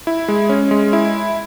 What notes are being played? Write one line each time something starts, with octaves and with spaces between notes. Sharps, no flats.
E4
G#3
C#4
G#3
E4